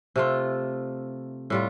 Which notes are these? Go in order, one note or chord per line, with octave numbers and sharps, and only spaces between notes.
C3 A3 F4
A2 G3 F4